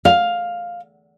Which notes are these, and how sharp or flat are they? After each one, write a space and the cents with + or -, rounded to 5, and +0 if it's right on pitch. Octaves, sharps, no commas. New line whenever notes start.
F5 +5